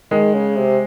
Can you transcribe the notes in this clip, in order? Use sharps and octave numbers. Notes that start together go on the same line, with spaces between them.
D#3 G#3
C#3
C3